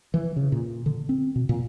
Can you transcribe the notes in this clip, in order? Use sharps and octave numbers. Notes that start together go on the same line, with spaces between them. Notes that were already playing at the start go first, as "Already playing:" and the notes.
E3
C#3
A#2
D3
C4
B2
A#2